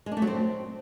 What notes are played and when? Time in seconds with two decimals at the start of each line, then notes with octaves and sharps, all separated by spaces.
0.06 G#3
0.12 D4
0.17 A3
0.22 F#3
0.27 C4